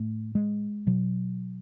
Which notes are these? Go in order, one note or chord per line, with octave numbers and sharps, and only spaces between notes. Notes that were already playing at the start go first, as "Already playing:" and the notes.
Already playing: A2 A3
G#3
B2 F#3